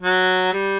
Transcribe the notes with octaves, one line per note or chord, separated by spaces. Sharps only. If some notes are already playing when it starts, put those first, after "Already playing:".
F#3
G3